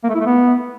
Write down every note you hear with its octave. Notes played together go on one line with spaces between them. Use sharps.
A#3
A3
E4
A3
B3